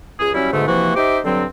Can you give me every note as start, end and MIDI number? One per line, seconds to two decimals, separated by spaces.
0.19 0.29 37
0.19 0.29 68
0.34 0.52 54
0.34 0.52 55
0.34 0.52 61
0.34 0.52 64
0.52 0.64 44
0.52 0.64 47
0.52 0.64 50
0.52 0.64 57
0.67 0.92 48
0.67 0.92 52
0.67 0.92 53
0.67 0.92 58
0.67 0.92 66
0.96 1.18 63
0.96 1.18 67
0.96 1.18 72
0.96 1.18 76
0.96 1.18 86
1.24 1.44 43
1.24 1.44 50
1.24 1.44 54
1.24 1.44 60